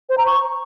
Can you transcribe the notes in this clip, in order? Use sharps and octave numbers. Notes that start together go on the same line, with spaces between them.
C5
A#5
C#6